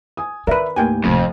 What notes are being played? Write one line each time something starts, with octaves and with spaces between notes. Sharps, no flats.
G#5 D#6
D#3 A#4 B4 D5 E5
D#2 A2 A#3 G5 G#5
D1 F2 C3